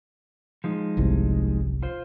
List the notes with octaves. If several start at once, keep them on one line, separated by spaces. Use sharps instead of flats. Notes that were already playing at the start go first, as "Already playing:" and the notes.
F3 G#3 D#4
G1 C2
F4 C5